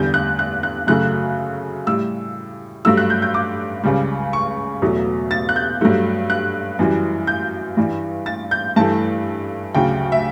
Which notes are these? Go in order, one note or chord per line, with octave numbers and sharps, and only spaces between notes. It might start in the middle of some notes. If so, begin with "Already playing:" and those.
Already playing: E2 D3 G3 G6
F#6
F#6
F#6
F#2 C#3 F#3 A3 F#6
A2 G3 E6
G2 F#3 A3 E6
F#6
G6
G6
D6
C#2 C#3 G3
C#6
E2 B2 F#3 A3
A6
F#6
G6
G2 F#3 A3
F#6
F#2 E3 G3
G6
G2 E3 G3
A6
G6
G2 E3 A3 A5
D2 C#3 F#3 G5
E5